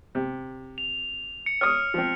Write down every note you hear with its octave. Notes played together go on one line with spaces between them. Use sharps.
C3
F7
C#7
C#5 D#6 F6
F3 C4